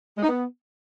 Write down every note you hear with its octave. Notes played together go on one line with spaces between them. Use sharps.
G#3
D#4
B3